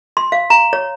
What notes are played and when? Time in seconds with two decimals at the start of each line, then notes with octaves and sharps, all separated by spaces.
0.17 C6
0.32 F5
0.50 A#5
0.73 C#5